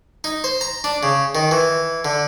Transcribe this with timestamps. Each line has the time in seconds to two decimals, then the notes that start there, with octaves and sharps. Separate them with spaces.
0.24 D#4
0.44 C5
0.61 A#5
0.84 D4
1.03 C#3
1.35 D#3
1.51 E3
2.05 D3